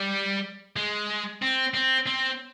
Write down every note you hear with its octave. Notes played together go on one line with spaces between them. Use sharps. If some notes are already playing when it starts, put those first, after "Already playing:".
Already playing: G3
G#3
C4
C4
C4